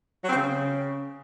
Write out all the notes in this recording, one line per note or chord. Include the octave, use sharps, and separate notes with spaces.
F#3
C4
C#3